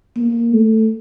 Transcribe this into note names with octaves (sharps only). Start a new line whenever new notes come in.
A#3
A3